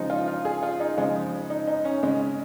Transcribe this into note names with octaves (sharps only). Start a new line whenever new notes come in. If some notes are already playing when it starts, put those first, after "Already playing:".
Already playing: C#3 F3 G#3 D#4
F4
F4
G#4
F4
D#4
C#3 F3 G#3
D#4
D#4
C#4
C#3 G#3